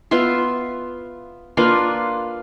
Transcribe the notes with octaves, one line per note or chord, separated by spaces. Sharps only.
B3 F4 E5 C6
A#3 D4 F4 B4